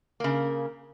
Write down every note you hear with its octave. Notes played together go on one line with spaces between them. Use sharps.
C#3 A#3